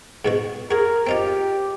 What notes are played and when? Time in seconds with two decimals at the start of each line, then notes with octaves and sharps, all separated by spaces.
0.25 G#2 B2 F#4
0.71 F#4 G#4 A#4
1.07 C4 D#4 F4 G4